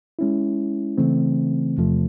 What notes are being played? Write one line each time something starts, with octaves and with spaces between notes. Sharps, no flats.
G#3 C#4 E4
C#3 E3 A3 C4
E2 C3 F3 A3